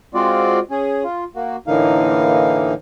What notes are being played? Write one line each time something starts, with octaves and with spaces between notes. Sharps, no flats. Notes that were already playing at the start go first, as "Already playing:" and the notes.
G#3 C4 F4 F#4 D5
C#4 G#4
F4
A#3 F#4
A2 D3 E3 A#3 D#4 F5